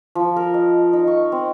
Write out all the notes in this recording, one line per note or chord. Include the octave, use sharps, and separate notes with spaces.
F3
A#4
D#5
D#4
C#6
C4